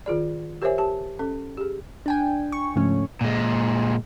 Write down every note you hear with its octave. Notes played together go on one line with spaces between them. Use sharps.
D#3 F4 G#4 D5
G4 A#4 C5 C#5 E5 G#5
G4 A5
C#4 A4
G4 G#4
D4 G5 G#5
C#6
G#2 C#3 F3 A3 C#4
A#2 G#3